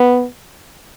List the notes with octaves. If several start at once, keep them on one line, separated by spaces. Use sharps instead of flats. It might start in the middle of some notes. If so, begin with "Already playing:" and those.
Already playing: B3